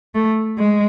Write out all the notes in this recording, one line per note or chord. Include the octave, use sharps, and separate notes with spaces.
A3
G#3